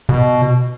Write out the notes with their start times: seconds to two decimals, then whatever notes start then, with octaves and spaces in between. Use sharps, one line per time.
0.09 B2